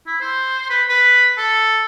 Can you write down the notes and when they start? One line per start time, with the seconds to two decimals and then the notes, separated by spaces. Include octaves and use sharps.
0.07 E4
0.21 C5
0.69 B4
0.89 B4
1.37 A4